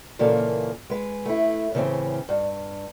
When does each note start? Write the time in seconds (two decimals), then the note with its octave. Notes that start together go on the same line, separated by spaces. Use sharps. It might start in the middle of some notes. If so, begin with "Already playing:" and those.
0.19 A#2 C#3 E3 A#3 F4 A4
0.90 G#3 B4
1.25 A3 E4
1.74 A2 C#3 E3 G3 C4 C#4
2.29 G2